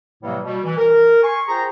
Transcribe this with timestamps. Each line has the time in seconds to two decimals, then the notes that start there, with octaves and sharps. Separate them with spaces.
0.23 A2 C3 E3 F#3 G3 A#3
0.44 B2 G3
0.64 E3
0.77 A#4
1.23 G#5 C6 C#6
1.47 F4 G#4 C5 G5 A#5